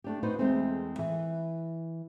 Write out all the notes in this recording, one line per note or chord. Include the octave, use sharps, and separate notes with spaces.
A3 D4 G4
D#4 F#4 B4 C5
E2 G#3 A3 C4 G#4
E3